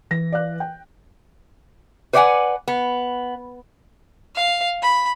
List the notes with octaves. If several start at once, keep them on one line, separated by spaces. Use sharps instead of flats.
E3 A#6
D5 F5 F#6
G5
B4 C5 D5 F5 F#5 G#5
B3
F5
B5